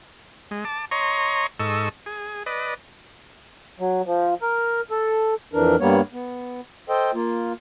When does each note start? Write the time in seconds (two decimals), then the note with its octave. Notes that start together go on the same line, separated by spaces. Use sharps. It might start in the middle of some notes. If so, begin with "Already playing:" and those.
0.51 G#3
0.65 A5 D6
0.91 C#5 D#5 A#5 C6 C#6
1.60 G#2 A4 D#5 C#6 E6
2.06 G#4
2.46 B4 D5 D#5
3.80 F#3
4.06 F3
4.42 A#4
4.91 A4
5.53 F2 E3 D4 A#4
5.80 G2 G3 A#3 B3 C#5
6.13 B3
6.89 A4 C5 D#5 G5
7.14 A#3 F4